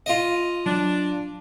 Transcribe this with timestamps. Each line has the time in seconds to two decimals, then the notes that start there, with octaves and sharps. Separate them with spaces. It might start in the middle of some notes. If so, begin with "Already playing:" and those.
0.06 F4 D#5
0.66 F#3 D4